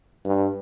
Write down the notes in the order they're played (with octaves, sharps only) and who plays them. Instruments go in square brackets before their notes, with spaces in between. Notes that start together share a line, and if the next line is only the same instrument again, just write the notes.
[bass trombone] G2